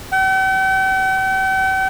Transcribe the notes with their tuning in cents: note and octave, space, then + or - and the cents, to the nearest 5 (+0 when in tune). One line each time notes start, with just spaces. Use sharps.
G5 -45